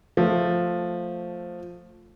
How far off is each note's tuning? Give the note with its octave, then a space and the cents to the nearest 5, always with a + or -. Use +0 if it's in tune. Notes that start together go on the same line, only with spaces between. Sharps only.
F3 +5 A3 +10